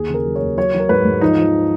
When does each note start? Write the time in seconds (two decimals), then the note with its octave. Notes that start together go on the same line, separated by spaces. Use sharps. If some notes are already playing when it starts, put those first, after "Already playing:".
Already playing: D#2 G#4
0.09 C#3 A#4
0.25 F#3
0.36 C#5
0.41 D#2
0.57 F#3 C#5
0.74 F#3
0.79 A#4
0.89 G#2 B4
1.05 G#2
1.21 F3 D#4
1.38 F3